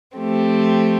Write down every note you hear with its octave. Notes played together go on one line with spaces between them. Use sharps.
F3 A3 C4 G4